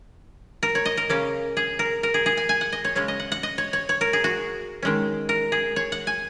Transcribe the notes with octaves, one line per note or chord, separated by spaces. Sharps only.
A#4
C#5
D#5
A#4
C#3 A#3 C#4
G#4
A#4
A#4
G#4
G#4
G#5
G#5
F#5
D#5
C#5
C#3 G#3 C#4 C#5
D#5
F#5
F#5
D#5
C#5
C#5
C#5
A#4
G#4
F#4
D#3 G#3 C#4
A#4
G#4
C#5
F#5
G#5